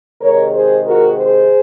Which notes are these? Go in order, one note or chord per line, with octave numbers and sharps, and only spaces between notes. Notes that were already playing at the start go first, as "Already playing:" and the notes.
C3 D#3 G#3 A#4 C#5
G#4 C5
F#4 A#4
G#4 C5